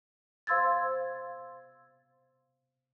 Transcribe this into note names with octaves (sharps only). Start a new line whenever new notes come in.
C5 F5 C6 E6 G#6 A6